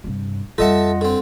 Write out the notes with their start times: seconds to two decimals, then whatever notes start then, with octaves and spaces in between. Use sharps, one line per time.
0.04 G2 C3
0.58 F2 G3 F4 A4 D#5 E5 F#5 A5
1.01 D3 C4